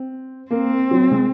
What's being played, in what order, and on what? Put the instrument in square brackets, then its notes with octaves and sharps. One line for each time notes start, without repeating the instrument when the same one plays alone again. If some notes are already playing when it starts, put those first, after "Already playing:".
Already playing: [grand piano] C4
[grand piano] A#3 [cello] C4
[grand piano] F#3
G#3